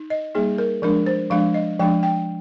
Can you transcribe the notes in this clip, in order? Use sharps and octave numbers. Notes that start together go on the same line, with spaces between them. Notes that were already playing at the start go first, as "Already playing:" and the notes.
Already playing: D#4
D#5
G3 A#3 D#4 G#4
A#4
F3 G#3 D4 A#4
C5
F3 G#3 D4 F5
D#5
F3 G#3 D4 G5
G5